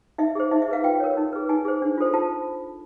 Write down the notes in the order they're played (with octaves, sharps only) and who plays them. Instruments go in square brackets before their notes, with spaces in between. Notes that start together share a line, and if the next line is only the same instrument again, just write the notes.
[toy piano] D#4 E5
G#4 C5
D#4 E5
E5
G#4 B4 F5
F4 G5
A#4 C#5
D#4
G#4 B4
D#4 G#5
G#4 C5
D4
F4 A4 C5
F4 A5